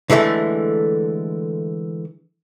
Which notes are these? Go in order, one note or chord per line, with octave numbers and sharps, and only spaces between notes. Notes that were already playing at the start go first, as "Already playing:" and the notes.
D3 E3 G#3 A3